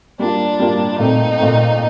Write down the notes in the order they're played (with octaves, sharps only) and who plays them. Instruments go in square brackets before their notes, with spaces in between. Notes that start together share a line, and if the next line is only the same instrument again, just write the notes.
[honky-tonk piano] G3 A#3 F4 [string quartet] D4
[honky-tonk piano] G3 A#3 F4
[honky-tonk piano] A#2 A3 C4 [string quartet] D#4
[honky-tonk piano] A#2 A3 C4